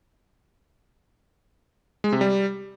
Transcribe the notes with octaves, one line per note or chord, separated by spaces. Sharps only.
G#3
C3
G3